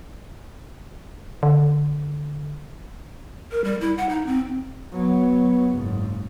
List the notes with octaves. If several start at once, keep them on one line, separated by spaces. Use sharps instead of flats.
D3
A#4
G3
E4
F#5
D#4
C4
F#3 B3
F#1 G#2